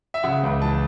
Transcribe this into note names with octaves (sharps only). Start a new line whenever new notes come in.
E5
C#3 F#5
C#2
E3 A5